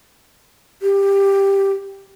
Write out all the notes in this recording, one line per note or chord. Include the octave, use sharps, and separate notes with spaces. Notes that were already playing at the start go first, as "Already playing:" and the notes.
G4